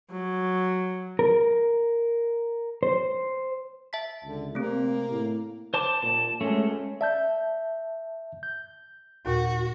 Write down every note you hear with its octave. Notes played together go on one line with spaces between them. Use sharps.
F#3
A#4
C5
E5 A5 B6
C#2 D3
C3 A3 A#3 C4
A2
C5 A5 D6
A#2 A5
G#3 A3 C#4
D5 E5 A5 G6
G6
D#2 A#2 F#4